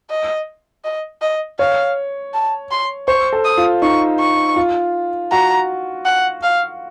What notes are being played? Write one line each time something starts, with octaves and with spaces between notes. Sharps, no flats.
D#5
D#5
D#5
C#5 F5
A5
C6
C5 C#6
A4
D#6
F4
D#4 C#6
C#6
F4
F#4 A#5
F#5
F5